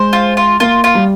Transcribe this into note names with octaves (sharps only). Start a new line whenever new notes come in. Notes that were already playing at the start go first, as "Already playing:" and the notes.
Already playing: G#3 C5
F4
F4
A#3 F4
F4
G3